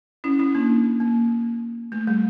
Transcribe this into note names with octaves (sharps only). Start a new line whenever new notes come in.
C#4 E4
C#4 E4
A#3 D4
A#3
A3
G3